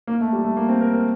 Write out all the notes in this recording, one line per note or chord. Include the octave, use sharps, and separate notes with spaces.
A#3
A3
G3
A3
A#3
C4
A#4
A#4